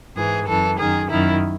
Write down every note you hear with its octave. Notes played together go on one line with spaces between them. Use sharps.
G#2 E3 G#4
F#2 E3 A4
F#2 D#3 G#4
F#2 D#3 E4